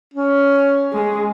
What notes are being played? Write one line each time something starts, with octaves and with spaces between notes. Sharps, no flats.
C#4
G#3 G#4